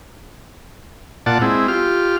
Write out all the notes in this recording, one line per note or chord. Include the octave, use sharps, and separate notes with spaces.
A#2 F4 D5 F#5 A5
G#3 C4 E4
F4 G4 F6